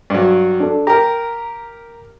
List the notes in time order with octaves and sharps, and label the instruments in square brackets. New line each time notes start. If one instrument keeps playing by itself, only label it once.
[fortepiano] G2 F#3
[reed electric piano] D4 A4
[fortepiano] G4 A#4 [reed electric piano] A#5